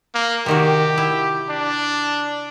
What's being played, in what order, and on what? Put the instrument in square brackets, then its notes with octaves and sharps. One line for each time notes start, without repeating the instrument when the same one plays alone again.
[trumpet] A#3
[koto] C3 D#3 F#4 [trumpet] G4
[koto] E4
[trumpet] D4